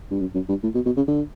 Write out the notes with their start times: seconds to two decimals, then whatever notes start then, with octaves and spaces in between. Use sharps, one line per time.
0.11 G2
0.20 F#2
0.34 F#2
0.49 G2
0.63 A2
0.75 B2
0.86 B2
0.97 C#3
1.08 D3